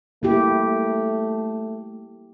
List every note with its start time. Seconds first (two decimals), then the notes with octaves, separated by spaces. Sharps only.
0.23 A3 A#3 E4 G4